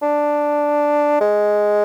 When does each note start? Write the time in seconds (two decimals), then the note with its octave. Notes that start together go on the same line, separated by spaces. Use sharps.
0.02 D4
1.21 G#3